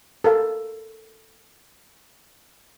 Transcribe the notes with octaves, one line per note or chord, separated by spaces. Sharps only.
A4 A#4 F5